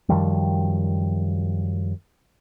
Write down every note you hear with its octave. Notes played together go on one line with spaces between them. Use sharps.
F#2 D#3 F3 G3